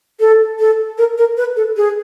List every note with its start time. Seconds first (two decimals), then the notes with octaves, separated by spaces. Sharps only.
0.20 A4
0.59 A4
0.98 A#4
1.18 A#4
1.37 B4
1.56 A4
1.77 G#4